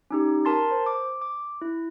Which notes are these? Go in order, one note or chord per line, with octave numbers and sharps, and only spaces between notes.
C#4 D#4 G4
A#4 A5 C6 A6
C5
D6
D6
E4